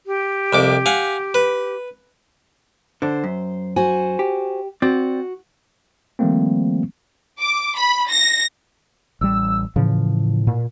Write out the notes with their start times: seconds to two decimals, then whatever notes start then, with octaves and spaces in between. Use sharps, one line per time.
0.06 G4
0.53 C2 F2 D6
0.86 F5 F#5 G#5
1.34 B4
3.02 D3 D4 C5
3.24 F#2
3.76 F#4 C5 G#5
4.19 G4
4.82 C4 F#4 D5
6.19 D#3 F3 G3 A3 A#3 C4
7.40 D6
7.77 B5
8.09 A#6
9.21 A1 G3 E6
9.76 A2 C#3 E3 F3
10.47 A#2